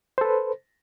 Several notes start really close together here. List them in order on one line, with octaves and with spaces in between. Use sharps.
C5 A4 B4